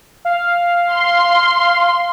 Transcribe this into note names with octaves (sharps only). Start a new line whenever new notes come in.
F5
C6